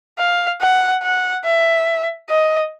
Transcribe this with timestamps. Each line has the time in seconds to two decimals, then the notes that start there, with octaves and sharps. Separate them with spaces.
0.19 F5
0.61 F#5
1.03 F#5
1.45 E5
2.29 D#5